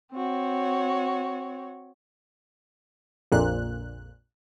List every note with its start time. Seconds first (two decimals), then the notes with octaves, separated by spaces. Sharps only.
0.14 C4 F#4 C#5
3.32 A#1 F2 A#2 F#6